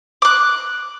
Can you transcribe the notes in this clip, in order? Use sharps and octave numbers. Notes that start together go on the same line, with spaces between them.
D6 F#6